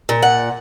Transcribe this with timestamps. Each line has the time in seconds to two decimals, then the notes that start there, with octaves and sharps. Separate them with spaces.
0.09 A#2
0.22 F#5